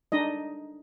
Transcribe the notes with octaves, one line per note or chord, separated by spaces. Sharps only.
D4 D#4 D#5